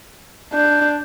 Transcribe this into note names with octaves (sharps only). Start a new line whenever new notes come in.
D4 G6